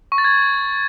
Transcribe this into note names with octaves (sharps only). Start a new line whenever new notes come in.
C#6
A6
G#6